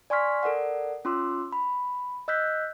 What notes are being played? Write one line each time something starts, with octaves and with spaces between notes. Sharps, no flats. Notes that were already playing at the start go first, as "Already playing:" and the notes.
D5 G#5 C6 C#6 F6 B6
A4 A#4 D5 F#5
C#4 F4 C6 D6 E6
B5
D#5 E6 F#6 G6 B6